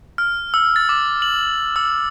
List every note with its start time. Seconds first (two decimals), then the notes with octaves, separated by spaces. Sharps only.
0.18 F6
0.54 E6
0.76 A6
0.89 D6
1.22 F#7
1.76 E6